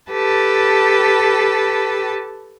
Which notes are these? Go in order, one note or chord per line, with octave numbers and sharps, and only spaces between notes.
G4 A4 B4 A5